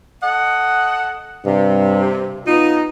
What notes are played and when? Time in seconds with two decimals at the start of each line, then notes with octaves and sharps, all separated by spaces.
0.22 A4 D#5 F#5
1.46 G2 C3
2.47 B3 D#4 F4